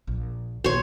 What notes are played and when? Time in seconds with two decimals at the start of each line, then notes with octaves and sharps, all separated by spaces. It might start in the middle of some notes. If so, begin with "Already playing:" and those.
0.07 A#1
0.64 B1 A#3 C5 C#5